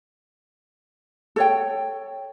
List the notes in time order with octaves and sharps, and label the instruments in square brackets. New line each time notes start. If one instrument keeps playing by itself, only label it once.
[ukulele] A4 C#5 G5